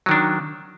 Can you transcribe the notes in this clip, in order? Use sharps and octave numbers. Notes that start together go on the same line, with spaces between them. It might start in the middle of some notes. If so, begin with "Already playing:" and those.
D#3 F#3 D4